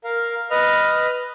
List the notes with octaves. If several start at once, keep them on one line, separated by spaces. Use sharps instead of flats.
A#4 F5
B4 D#5 F6